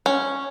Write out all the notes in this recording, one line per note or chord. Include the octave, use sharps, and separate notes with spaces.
C#4